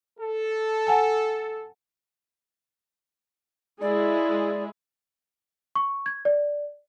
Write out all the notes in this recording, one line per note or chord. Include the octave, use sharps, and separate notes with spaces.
A4
F#5 G#5 A5
G#3 E4 G#4 D5
C#6
G#6
D5